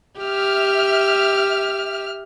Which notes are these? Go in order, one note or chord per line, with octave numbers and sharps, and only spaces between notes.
G4 E5 F6